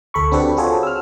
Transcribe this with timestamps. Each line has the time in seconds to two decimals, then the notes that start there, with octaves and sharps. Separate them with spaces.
0.14 D2 A4 B5 C#6
0.32 C4 D4 F#4 G4 A4 B4
0.57 F4 F#4 G#4 A4 C5 C#5
0.83 E6 F6